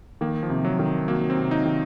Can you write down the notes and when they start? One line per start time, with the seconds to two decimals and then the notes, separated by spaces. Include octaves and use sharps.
0.21 D#3 A#3
0.43 F3
0.50 C3
0.65 F#3
0.79 D#3
1.08 F#3 A#3
1.30 C4
1.37 C3
1.51 D#4
1.65 D#3